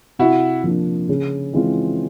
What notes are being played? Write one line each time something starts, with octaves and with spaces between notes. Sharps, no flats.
C3 E4 F#4
F3 A#3 D4
C#3
E3 G#3 C4 F4